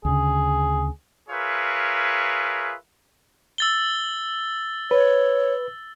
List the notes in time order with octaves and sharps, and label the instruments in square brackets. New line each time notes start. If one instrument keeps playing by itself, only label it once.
[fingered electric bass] D2 C#3 [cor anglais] G#4
[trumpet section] F4 G#4 A#4 B4 C#5 E5
[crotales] E6 A6 G7
[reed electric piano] B4 [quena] C#5